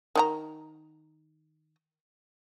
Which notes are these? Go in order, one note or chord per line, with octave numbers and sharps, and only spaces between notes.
D#3 D#4 A#5